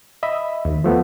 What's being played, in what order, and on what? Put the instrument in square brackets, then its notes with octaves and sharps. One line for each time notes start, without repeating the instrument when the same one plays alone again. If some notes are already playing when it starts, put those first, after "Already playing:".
[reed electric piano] D#5 E5 B5
[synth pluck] D#2
[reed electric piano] F3 A3 B3